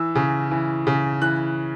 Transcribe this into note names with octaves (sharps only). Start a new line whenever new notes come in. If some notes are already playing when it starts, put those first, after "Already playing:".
Already playing: E3 E6
C#3
E3
C#3
E3 F#6